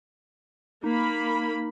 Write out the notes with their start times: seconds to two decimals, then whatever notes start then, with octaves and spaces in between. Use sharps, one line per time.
0.84 A#3 D#4 B5